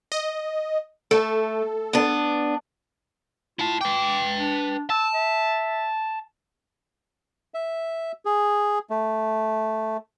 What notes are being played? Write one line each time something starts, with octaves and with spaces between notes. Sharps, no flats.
D#5
A3 A4
B3 D4
E4 F4 A5
B4 G5 D6
D4
A5 E6
E5
E5
G#4
A3